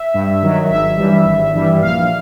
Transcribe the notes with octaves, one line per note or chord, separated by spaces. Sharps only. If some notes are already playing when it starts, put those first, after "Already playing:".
Already playing: E5
G2
D#3 F#3
G#1 E5
G2 E3 G3
G#1
G2 E3 G3
A#1 F5